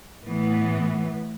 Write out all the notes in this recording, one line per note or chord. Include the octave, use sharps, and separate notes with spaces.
A2 E3 B3